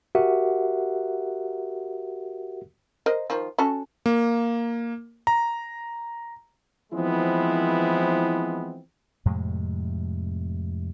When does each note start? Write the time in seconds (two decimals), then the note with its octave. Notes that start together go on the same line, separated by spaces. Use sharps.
0.15 F#4 G4 A#4 E5 F#5
3.06 A#4 C5 D#5
3.30 D#3 F3
3.58 C#4 F#4 A4
4.06 A#3
5.27 A#5
6.93 E3 F3 G#3 B3 C4 E4
9.25 F2 A2 C3 G#3